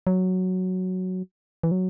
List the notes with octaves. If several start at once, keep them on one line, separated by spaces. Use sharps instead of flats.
F#3
E3
F#3